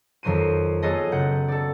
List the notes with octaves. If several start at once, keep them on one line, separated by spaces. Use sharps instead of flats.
F2 D#3 F#3 C5 C7 D#7
F#3 B3 F4 G#4 A4 D#5
F#1 F#5 G6
A4 D5